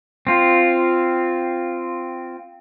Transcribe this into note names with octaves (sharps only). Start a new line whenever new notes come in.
C4 F4